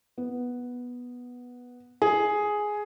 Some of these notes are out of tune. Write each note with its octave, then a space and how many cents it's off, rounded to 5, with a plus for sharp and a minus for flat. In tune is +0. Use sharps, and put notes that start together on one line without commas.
B3 -5
G#4 +5